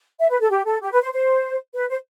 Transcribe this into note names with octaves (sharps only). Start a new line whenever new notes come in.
E5
B4
A4
G4
A4
G4
B4
C5
C5
B4
C5